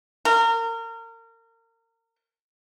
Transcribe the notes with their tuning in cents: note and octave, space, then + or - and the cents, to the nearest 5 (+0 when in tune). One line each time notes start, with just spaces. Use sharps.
A#4 -30